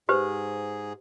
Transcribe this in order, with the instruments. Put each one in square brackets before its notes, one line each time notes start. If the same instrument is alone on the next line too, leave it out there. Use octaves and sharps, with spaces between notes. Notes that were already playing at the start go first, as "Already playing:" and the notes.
[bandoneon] G#2 G#4 [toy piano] G4 B4 C5